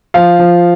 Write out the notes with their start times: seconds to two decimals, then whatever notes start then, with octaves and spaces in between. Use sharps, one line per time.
0.14 F3 F5
0.39 F3